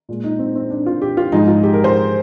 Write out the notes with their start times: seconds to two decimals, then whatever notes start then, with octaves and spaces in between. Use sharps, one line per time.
0.09 A#2 G#3
0.24 D#4
0.39 C4
0.55 C4
0.70 D4
0.86 F4
1.02 G4
1.17 F4
1.32 G#2 F3 G#3 D#4
1.47 F4
1.63 G4
1.73 A#4
1.84 C5